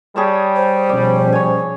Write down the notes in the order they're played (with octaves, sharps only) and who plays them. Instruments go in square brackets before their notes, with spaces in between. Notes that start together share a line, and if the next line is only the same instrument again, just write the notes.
[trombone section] G3 [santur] G#4 C#5 A5
[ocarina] C5
[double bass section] B2 F3 C#4 [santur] D5
[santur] C#5 G#5